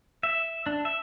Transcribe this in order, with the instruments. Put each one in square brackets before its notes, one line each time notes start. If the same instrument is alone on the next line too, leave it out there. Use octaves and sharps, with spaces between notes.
[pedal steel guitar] E5
D4
E5